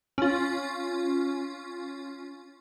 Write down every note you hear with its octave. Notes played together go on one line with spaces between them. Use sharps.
C#4 F4